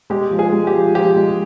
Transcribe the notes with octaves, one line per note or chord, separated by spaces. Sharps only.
G#3 G4
F3
G#4
G#3
G4
F3
F3 G4
G#3